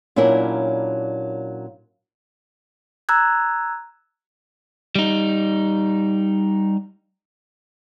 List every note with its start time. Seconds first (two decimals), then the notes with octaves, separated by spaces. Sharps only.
0.16 A#2 F#3 C#4 D4 E4 A#4
3.09 A#5 E6 F#6 G#6
4.95 G3 D#4